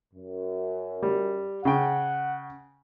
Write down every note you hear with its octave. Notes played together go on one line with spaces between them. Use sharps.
F#2
G3
C#3 F#5 G5